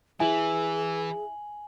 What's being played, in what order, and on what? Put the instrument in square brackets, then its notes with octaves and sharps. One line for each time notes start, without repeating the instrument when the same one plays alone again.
[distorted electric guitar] E3 [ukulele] E4 [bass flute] G#4 [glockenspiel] G#5 F#7